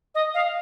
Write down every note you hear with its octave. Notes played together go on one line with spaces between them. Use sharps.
D#5
F5